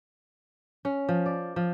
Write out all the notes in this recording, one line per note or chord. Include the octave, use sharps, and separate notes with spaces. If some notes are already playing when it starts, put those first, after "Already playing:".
C#4
F3
D5
F3